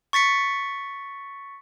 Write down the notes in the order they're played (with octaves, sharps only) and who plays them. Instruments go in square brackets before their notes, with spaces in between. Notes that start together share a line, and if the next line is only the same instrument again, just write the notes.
[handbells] C#6 A6 B6 C#7